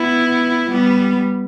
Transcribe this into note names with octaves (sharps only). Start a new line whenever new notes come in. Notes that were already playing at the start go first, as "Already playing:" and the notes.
Already playing: B3 E4
G3 B3